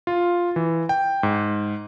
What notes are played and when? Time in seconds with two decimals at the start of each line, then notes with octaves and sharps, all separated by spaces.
0.07 F4
0.56 E3
0.89 G5
1.23 G#2